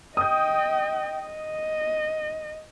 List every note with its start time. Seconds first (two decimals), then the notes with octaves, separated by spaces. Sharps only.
0.17 D#5 G5 D#6 G6
1.22 D#5